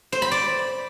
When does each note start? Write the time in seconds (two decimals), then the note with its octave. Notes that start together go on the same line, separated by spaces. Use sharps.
0.12 C5
0.22 B5
0.31 D5